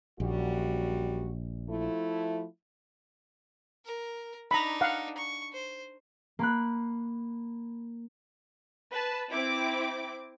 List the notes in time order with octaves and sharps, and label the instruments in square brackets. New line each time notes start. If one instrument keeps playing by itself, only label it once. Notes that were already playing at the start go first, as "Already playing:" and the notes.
[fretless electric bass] A#1 [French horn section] F#2 G3 F#4
[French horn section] F3 A3 E4
[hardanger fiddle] A#4
[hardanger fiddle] D4 D#4 [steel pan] A#5 B5
[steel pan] F5 F#5
[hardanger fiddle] C#6
C5
[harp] A#3 B5 F#6
[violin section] B4 A5
C4 E4 D6